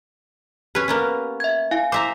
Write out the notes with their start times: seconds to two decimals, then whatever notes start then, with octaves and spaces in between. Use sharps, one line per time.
0.75 C#4 G4 B4
0.88 A#3 B3 C#4
1.40 E5 G#6
1.71 E4 F5 G#5
1.92 C5 E5 A#5 D6